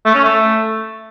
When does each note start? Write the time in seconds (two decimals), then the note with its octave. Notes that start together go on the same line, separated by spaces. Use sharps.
0.06 A3
0.15 C#4
0.24 A3